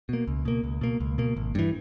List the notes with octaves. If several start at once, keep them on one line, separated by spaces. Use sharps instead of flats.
B2 A#3
C#2
B2 A#3
C#2
B2 A#3
C#2
B2 A#3
G#1
G2 E3